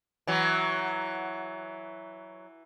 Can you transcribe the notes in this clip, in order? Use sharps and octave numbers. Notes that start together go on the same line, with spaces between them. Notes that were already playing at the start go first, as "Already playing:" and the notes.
E3 F#3